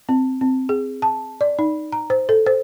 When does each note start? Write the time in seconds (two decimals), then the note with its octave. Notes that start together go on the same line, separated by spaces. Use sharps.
0.09 C4
0.41 C4
0.69 G#4
1.02 A5
1.41 D5
1.59 D#4
1.92 A#5
2.10 C5
2.29 A4
2.46 C5